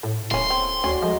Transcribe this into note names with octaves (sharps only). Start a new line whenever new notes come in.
A2 A4
D1 A#3 C#4 E4 C6 C#6
C4
D2 C#4 F#4 D5
F3 G#3 A3 A#5